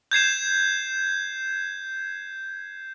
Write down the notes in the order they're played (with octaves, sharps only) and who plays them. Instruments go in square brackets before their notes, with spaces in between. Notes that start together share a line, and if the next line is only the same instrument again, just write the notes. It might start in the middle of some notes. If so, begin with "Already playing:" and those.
[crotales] G6 G#6 C7 E7